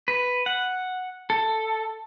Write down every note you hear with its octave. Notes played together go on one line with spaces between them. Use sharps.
B4
F#5
A4